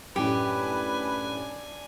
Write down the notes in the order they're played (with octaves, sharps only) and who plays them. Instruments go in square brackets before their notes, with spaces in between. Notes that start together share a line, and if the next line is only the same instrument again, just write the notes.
[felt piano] F#2 A2 [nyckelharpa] D4 G#5 [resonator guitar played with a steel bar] G4 [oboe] B4